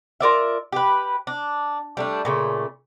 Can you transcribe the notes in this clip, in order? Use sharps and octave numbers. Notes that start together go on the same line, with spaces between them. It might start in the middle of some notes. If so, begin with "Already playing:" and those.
F4 A#4 D5 E5
G4 B4
D4
G3 A3 D4
A#2 C#3 A3